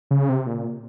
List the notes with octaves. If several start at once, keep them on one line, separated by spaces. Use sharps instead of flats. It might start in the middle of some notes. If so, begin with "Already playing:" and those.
C#3
C3
A#2